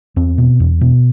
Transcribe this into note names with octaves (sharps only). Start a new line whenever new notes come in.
E2 C4
B2
E2
B2